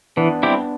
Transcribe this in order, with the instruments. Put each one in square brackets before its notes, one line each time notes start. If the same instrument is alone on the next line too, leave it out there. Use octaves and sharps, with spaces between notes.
[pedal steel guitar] E3 [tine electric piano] B3 D4
[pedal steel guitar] G3 C4 E4 G4